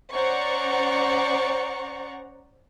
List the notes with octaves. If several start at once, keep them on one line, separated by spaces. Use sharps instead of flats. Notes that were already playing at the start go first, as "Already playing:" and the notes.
C#4 C5 D5 F#5 A#5 C#6